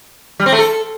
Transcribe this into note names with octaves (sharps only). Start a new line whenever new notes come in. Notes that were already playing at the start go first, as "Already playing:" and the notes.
G3
C4
A3
A4